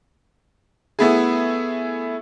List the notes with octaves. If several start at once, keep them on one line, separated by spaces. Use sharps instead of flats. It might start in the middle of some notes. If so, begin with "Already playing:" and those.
A3 B3 E4 G#4